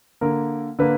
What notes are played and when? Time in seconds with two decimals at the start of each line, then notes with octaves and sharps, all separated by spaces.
0.21 D3 A#3 A#4
0.79 D3 A#3 B4